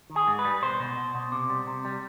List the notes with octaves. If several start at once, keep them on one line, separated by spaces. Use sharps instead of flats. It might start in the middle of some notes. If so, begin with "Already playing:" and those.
D#3
G#4
G#2
B4
G3
B2 C5
B2
B2
B2
C3
G3
C3
G3